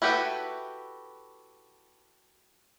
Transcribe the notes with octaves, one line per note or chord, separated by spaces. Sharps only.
E4 F#4 G4 A4 B4